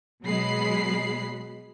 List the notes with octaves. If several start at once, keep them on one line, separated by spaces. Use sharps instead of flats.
B2 F#3 G#3 B3 B5 C7